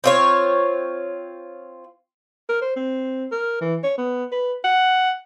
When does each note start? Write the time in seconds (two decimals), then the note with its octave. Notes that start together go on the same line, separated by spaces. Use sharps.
0.04 C4 F4 C#5
2.49 A#4
2.62 C5
2.76 C4
3.32 A#4
3.61 E3
3.83 C#5
3.98 B3
4.32 B4
4.64 F#5